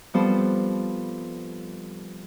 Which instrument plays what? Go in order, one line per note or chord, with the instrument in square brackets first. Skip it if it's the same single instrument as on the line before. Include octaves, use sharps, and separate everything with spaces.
[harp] F3 G3 B3 C4 A4 C5